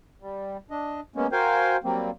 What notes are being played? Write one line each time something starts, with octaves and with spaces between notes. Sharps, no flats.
G3
D4 D#5
G#3 A#3 B3 C#4
F#4 A#4 C5 F5 G5 G#5
F#3 G3 A#3 C4